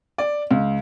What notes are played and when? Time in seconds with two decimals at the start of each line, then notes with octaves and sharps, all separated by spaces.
0.18 D5
0.51 C#2